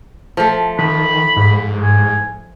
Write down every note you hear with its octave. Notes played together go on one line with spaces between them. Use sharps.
F3 A3
D#3 B5
G#2
G#5